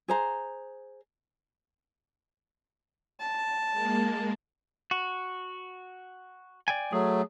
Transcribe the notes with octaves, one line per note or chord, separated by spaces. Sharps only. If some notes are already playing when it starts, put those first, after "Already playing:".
G#4 C5 A#5
A5
G#3 A#3
F#4
D5 G5 G#5
F#3 A3 G#4